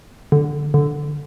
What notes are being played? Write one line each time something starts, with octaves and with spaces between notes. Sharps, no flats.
D3
D3